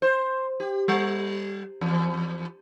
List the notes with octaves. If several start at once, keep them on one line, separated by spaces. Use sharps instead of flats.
C5
G4
G3
E2